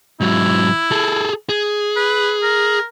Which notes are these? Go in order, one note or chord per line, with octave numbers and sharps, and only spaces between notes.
G#2 F#3 E4
G#4 A4
G#4
B4
A#4